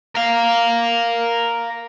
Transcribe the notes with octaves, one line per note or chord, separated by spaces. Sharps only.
A#4 F5